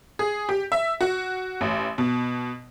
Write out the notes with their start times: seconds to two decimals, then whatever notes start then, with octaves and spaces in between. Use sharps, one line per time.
0.19 G#4
0.49 G4
0.72 E5
1.01 F#4
1.61 A1
1.98 B2